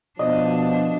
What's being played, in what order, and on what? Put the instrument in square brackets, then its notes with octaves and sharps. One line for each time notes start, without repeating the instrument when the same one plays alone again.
[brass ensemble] B2 F3 [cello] D4 [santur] D#5